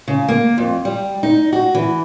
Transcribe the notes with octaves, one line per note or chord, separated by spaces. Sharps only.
C#3
A#3
F2
G3
D#4
F#4
E3